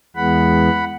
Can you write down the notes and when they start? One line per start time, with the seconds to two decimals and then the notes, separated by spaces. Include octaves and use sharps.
0.16 E2 E3 G#3 B3 F#5 B5